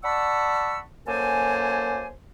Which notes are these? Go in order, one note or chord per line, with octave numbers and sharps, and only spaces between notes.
D5 F#5 A5 B5 C#6 E6
F#2 A#3 A4 C5 G#5